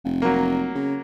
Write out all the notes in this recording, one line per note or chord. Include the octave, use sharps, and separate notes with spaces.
F1
F#3 A#3
C#3